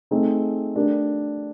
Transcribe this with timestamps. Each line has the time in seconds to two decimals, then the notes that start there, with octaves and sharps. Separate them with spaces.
0.11 A3 C4 D#4 G#4
0.75 A3 D4 G4 A#4